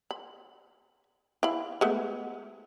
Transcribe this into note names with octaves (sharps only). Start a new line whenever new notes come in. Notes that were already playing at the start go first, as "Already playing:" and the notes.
B5
E4 F5 B5
G#3 A3 B3